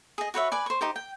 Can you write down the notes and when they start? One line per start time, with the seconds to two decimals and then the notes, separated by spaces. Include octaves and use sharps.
0.18 G#4 D#5
0.34 F#4 B4 C#5 E5
0.52 B4 D5 G#5
0.66 C5 C#6
0.81 D#4 G4 C5
0.96 G5